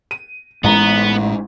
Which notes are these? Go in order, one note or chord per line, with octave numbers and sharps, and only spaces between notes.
D#7
A1 A2 G#3 B3 A#5